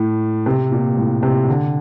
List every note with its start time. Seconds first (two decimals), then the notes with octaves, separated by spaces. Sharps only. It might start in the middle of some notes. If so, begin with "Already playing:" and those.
Already playing: A2
0.46 C3
0.72 A#2
0.97 A2
1.23 C3
1.48 D3